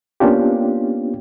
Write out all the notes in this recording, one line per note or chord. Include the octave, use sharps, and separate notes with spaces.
A#3 B3 C#4 D4 F4 G4